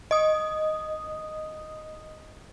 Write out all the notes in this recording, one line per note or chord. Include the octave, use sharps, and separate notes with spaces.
D#5 D#6